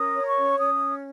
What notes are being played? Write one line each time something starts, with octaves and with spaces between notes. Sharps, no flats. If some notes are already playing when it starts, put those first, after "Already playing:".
Already playing: C#4 A#4 D#6
C#5
A#5
C#6
C#4
C#4 D#6